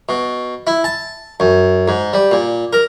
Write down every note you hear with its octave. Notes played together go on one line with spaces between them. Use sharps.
B2
E4
A5
F#2
G#2
G3
A#2
A#4